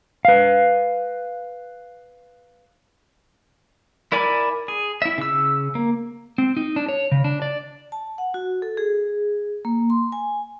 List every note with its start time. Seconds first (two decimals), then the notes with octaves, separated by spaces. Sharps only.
0.25 B4 F5
4.12 E4 A#4 D5 G#5 B5
4.68 G#4
5.02 E4 E5
5.18 C#3 E6
5.75 A#3
6.38 C4
6.57 D#4
6.76 D4
6.89 C#5
7.12 C#3
7.24 D4
7.42 D5
7.92 A5
8.18 F#5
8.34 F#4
8.62 A4
8.77 G#4
9.65 A#3
9.90 C6
10.12 G#5